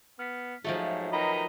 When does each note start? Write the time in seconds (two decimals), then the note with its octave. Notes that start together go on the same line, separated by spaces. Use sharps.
0.19 B3 F6 B6
0.64 G#2 F3 F#3 A3 F4 D#5 E5
1.12 D#3 F4 A#4 B4 D#5 A#5 B5